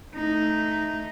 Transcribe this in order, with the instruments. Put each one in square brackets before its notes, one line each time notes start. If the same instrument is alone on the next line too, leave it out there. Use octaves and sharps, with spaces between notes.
[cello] A3 D#4